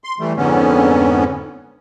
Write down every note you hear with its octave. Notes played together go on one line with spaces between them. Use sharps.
C6
E3 G3 A3
F2 G#2 D3 B3 C#4